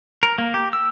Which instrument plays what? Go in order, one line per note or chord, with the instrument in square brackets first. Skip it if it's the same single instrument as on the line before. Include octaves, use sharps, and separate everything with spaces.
[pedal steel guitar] A#4
A#3
G4
E6